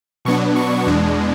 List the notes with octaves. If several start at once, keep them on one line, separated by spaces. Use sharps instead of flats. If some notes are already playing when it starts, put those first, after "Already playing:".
B2 F#3 B3 D4 C#6
C#6
E2 B2 G#3 D4